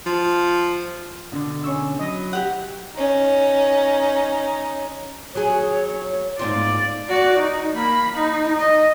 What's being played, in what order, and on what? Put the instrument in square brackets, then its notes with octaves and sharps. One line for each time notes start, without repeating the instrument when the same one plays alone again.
[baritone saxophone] F3
[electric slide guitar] B2 D3 [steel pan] D4
[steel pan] C#4 C#6 E6
[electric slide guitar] F#3 E4 [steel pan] D#5
[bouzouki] G4 F#5
[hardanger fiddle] C#4 D#4
[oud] F#3 G#4 [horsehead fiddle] C#5
[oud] G#2 C4 F4 [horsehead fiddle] D5
[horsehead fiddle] F#4 D5
D#4
A#3 B5
D#4
D#5